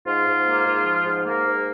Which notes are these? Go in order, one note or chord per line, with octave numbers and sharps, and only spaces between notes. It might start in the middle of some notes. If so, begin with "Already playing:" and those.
G#2 F4
G#2
A#3
G#2
F3
G#2
A#3
G#2